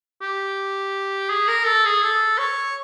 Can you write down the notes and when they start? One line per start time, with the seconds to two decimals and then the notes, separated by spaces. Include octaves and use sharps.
0.22 G4
1.30 G#4
1.48 A#4
1.66 A4
1.85 G#4
2.02 A4
2.38 C#5